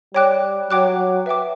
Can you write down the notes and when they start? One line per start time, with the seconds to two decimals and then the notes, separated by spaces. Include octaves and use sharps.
0.14 G3 C#5 G5 D6 F#6
0.70 F#3 C#5 G5 D6 F#6
1.26 B4 E5 G5 D6